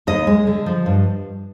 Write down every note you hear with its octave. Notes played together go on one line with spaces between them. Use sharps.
D#2 D#5
G#3
D3
F3
G2